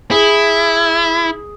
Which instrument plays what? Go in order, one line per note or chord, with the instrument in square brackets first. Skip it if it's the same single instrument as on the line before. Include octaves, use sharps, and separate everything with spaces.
[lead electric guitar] E4 [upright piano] G#4